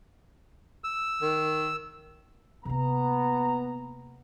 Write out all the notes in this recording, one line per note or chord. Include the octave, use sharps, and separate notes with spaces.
E6
D#3
C3 A#3 B3 A#5